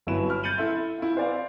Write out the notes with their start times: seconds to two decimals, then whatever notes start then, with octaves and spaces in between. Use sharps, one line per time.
0.07 G1 F#3 E4 B4 E7
0.29 B5 F6
0.43 G6 A6 C#7 D#7 F#7
0.57 E4 A4 E5 C6
0.98 E4 F4
1.17 C5 D5 F5